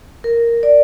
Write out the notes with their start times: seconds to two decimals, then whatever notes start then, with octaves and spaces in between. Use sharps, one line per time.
0.24 A#4
0.63 D5